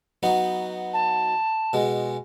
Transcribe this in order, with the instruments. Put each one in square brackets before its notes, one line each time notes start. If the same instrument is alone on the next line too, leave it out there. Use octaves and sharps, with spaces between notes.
[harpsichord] F#3 B3 D#4
[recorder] A5
[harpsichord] B2 G#3